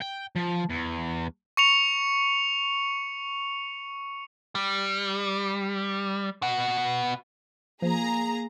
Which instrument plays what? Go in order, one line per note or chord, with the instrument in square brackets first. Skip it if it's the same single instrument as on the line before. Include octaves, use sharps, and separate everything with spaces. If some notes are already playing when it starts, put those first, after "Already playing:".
[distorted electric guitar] G5
F3
E2
[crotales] C#6 C#7 F7
[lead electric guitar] G3
B2 F#5
[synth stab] F3 [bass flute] A#3 [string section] G#4 A#5